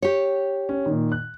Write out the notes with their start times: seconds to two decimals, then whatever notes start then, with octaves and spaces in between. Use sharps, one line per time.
0.02 G4 C#5
0.69 C#4
0.86 A#2 D#3
1.12 F#6